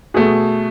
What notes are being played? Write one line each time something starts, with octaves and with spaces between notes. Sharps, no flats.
B2 A3 G#4